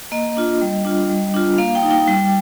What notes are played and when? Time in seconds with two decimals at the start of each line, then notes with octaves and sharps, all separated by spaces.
0.12 A#3 D#5
0.37 D4 F4
0.61 G3
0.85 D4 F4
1.10 G3
1.34 D4 F4
1.58 A#3 F5
1.75 G5
1.83 D#4
1.91 G5
2.07 G3 G5